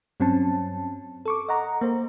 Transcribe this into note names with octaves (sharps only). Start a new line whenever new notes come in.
G2 F#3 C4 C#4 A5
A4 C#6 D6
D#5 F#5 A#5
A#3 C5